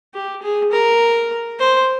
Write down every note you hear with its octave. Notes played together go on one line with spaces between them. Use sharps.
G4
G#4
A#4
C5